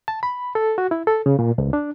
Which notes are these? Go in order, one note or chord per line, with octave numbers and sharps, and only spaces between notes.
A5
B5
A4
F#4
E4
A4
C#3
A#2
C#2
D4